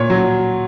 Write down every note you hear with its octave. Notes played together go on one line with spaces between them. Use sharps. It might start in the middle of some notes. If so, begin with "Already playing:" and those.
Already playing: A#2 C#5
F#3